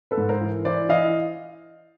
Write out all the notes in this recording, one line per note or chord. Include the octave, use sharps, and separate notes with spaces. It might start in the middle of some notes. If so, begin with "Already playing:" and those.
A4 B4
G#2
A#4 C5
E3
E3 C5 D5
E3 D#5 F5